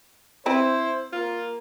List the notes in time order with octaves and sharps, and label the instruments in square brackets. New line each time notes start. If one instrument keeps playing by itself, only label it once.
[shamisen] C4 B4 [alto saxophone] E4 [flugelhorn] C5
[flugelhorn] A#3 [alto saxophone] F4